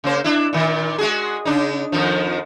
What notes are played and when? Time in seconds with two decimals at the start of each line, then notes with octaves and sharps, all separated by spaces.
0.04 C#3 A#3 C5
0.24 D4 E4
0.53 A#2 D#3
0.98 G#3 F#4 G#4
1.45 C#3 D4 D#4
1.92 F2 D#3 F3